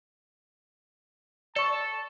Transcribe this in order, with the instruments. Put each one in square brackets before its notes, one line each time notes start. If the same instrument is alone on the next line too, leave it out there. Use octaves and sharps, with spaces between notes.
[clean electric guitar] A4 [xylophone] D5 C#6 [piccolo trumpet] A5